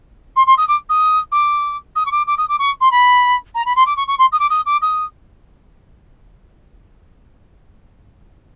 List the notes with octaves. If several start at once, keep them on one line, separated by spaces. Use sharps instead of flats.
C6
C6
D#6
D6
D#6
D6
D#6
C#6
D6
D6
D#6
D6
C#6
C6
B5
A#5
B5
C6
D6
C#6
C#6
C6
D#6
D6
D#6
D6
D#6